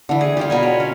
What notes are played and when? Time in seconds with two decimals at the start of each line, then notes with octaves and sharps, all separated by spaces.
0.09 D3 E3
0.21 G#4
0.37 G3 F4 G4
0.50 B2 A#4 G#5
0.63 C#5
0.80 C#4